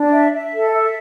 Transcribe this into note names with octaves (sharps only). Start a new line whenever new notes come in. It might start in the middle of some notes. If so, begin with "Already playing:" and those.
Already playing: D4
E5
E5
A4
E5